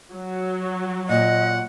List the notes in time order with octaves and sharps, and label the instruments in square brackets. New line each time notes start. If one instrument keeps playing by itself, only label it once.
[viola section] F#3
[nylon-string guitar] A#2 [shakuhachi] D#5 [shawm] F#5